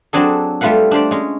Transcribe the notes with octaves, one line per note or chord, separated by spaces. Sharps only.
F#3 C4 D4 G#4 A4
G3 A3 F4 B4 F5 F#5
D4 G4 C5 D5
G#3 C#4